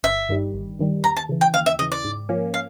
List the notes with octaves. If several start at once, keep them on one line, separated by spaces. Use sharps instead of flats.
G1 E5
G2 D#3 G3
G1
G2 D#3 G3
D#2 A#5
A5
C#3 E3
G5
D#2 F5
E5
C#3 E3 D#5
D5
G#2
F3 A#3 C#4
F5